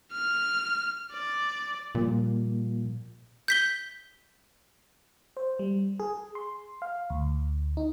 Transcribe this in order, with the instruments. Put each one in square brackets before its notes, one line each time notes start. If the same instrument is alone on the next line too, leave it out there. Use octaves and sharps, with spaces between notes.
[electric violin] F6
D5
[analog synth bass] A#2 [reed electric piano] F3 G3 A#3
[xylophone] G6 B6 G7
[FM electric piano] C5
G3
G#4
C6
F5
D2
D#4